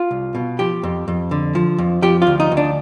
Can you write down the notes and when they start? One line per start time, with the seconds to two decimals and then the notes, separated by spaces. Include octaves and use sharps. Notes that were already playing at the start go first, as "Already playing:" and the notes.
Already playing: F4
0.11 C2
0.35 B2
0.59 F3 G4
0.83 F2
1.08 F2
1.31 D3
1.55 F3
1.78 F2
2.02 F3 G4
2.22 F4
2.27 D2
2.40 D#4
2.52 D2
2.57 D4